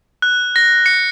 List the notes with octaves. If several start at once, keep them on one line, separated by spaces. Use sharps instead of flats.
F#6
A#6
C#7